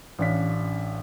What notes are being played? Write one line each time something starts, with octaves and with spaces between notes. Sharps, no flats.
A1 C#4 D4 F5 B6